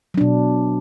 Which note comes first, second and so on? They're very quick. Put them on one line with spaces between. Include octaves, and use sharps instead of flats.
F#3 D4 B2